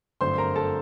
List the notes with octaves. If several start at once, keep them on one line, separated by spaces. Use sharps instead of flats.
G1 F#2 D3 A3 C4 C5 C6
A#4 A#5
A4 A5